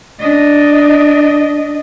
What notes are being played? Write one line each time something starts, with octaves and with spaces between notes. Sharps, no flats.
D4 D#5